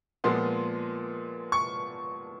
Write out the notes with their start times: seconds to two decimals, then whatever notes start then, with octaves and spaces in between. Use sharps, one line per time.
0.24 A#2 F3 G#3 B3 C6
1.52 C#6